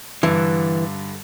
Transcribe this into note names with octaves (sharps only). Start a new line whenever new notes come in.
G2 D3 E3